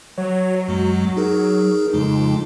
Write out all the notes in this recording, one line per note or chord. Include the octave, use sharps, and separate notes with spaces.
F#3 C#5
F#2 G#3
D#4 G#4 A#4
F2 C#3 G#3 D#4